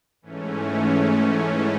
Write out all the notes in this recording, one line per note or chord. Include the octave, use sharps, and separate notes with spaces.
G#2 E3 A3 C#4